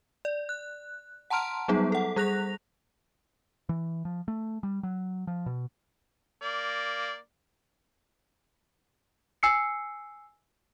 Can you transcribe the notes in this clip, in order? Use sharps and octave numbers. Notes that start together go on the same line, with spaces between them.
D5
F#6
F#5 A5 A#5 C6 F6 D7
F#3 G3 B3 D#4 G#4
A4 F#5
G3 G#4 F#6 A#6 F7
E3
F3
A3
G3
F#3
F3
B2
A#3 D5
G#5 E6 C7 C#7